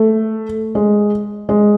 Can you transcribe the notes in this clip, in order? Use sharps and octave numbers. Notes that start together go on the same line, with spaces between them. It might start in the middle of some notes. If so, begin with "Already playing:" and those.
Already playing: A3
G#3
G#3